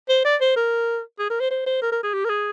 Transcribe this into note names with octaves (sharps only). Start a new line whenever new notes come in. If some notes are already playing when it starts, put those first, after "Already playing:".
C5
D5
C5
A#4
G#4
A#4
C5
C5
C5
A#4
A#4
G#4
G4
A#4
G#4